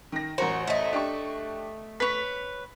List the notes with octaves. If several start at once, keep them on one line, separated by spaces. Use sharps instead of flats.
D#3 A#6
A1 F#4 A#4 C5
A3 D#5
D4 G4 C#6
B4 C#5 B6